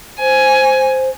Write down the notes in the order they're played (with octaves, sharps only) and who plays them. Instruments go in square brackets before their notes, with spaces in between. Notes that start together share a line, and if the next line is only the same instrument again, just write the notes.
[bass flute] C5 [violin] G#5